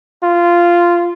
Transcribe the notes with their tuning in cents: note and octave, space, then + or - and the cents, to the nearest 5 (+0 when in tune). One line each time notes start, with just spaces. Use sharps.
F4 -10